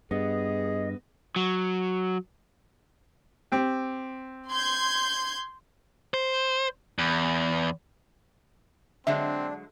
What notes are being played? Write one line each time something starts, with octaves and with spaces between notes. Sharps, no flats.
G2 B3 G#4 D#5
F#3
C4 G4
C6 G6 G#6
C5
E2
D3 F#3 G#3 C4 D4 E5